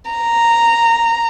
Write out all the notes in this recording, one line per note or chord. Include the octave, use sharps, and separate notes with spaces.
A#5